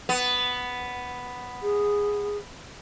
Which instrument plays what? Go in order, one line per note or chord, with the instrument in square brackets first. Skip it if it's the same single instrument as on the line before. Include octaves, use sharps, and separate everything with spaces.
[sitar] B3
[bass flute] G#4